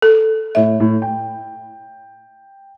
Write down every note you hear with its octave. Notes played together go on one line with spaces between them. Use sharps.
A4
A2 C#5 E5
A2
G5